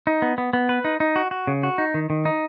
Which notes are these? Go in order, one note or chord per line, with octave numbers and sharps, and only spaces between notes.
D#4
B3
B3
B3
B4
D#4
D#4
F#4
F#4
C#3
F#4
D#4
D#3
D#3
D#4